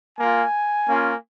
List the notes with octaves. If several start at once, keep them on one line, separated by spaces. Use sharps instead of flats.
A#3 F4 G#5
A#3 C#4 F4